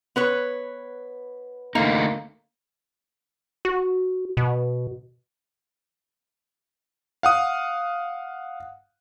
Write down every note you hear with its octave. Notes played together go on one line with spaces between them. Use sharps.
B3 B4 C#5
D3 A3 A#3 D#4
F#4
B2
F5 F#5 D#6